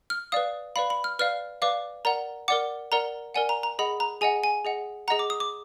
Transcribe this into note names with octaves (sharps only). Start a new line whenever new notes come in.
F6
B4 D5 F5 D#6
B4 D5 F5 B5
B5
F6
B4 D5 F5 F6
B4 D5 F5 D6
A#4 D5 F#5 A#5
A#4 D5 F#5 D6
A#4 D5 F#5 A#5
A#4 D5 F#5 G#5
A#5
A#5
G#4 D#5 F#5 B5
A#5
G#4 D#5 F#5 G#5
G#5
G#4 D#5 F#5
G#4 D#5 F#5 A#5
D6
D#6
D6